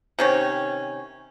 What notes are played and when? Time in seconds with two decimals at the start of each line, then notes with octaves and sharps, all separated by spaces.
0.19 C3 D#3 C#4